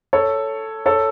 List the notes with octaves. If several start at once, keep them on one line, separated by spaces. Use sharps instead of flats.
A4 C#5
A4 C#5